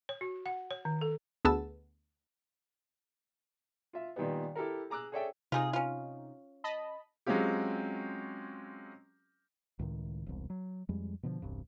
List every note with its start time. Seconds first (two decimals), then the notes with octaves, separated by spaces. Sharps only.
0.09 C#5
0.21 F#4
0.46 F#5
0.71 C#5
0.85 D#3
1.01 A4
1.45 D2 B3 G#4 A5 E6
3.93 F4 E5
4.16 A#2 D#3 G3 B3
4.55 E4 G4 A4 A#4
4.90 G#4 A#5 D6 E6 F#6
5.12 G#4 A4 C#5 D5 E5 G5
5.52 C3 D#4 F4 G#4
5.73 C#4 F4
6.64 D#5 A5 B5
7.26 F#3 G#3 C4 C#4 F4 G4
9.79 C#2 A2 D#3
10.26 E1 C2
10.50 F#3
10.89 F2 G3 G#3
11.23 B2 D3 F3
11.42 E1 C2 G2